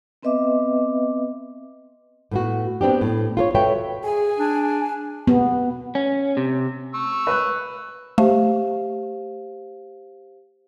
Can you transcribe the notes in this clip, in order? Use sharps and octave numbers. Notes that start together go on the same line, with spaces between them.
B3 C4 B4 D#5 E5 D6
A2 B3 F#4
B3 C4 D4 G4
A2
F4 A#4 C#5
F#4 A4 B4 C#5 E5 G5
G#4 G#5
D4
B3
C#4
C3
C#6 E6
B4 F#6
A3 G4 C5 F5